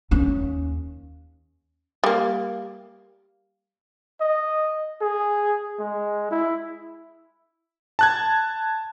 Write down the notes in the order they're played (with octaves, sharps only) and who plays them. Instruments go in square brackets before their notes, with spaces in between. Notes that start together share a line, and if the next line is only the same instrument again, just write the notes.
[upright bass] D#2 C#4
[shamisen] G3 A#3
[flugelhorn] D#5
G#4
G#3
E4
[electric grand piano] A5 F#6 G#6